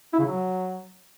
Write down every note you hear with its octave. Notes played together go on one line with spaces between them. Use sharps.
E4
C#3
F#3